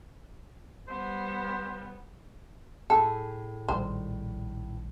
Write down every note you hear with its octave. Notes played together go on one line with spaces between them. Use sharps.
G3 B3 C5
A2 G#4 A4
A#1 D#3 G3 C5